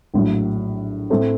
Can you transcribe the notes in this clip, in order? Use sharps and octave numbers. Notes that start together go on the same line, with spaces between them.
A#1 A2 F#3
A2 A3 C4